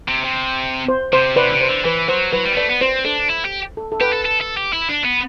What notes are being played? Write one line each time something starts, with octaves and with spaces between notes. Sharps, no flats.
C3
C3
C5
C3 C5
C3 B4 D5
D3
C3
C5
D3
E3 B4
F#3 C5
F#3 B4
G3
B3
A3 B4 D5
B3
C4 C5
D4 A4
E4
G4
A4
A4
G4 B4
A4
A4
A4
G4
E4
D4
B3